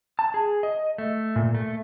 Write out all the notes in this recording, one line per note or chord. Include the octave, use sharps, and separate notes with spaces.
A5
G#4
D#5
A3
A#2
A3